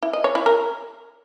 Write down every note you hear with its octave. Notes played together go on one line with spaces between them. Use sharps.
E4
D#5
C#5
E4
A#4